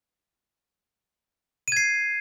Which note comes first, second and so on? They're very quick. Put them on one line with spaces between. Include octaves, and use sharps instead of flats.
D#7 G#6 C7